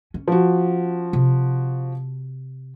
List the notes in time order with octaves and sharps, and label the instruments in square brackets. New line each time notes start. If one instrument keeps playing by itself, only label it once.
[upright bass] C#4
[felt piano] F3 F#4
[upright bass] C3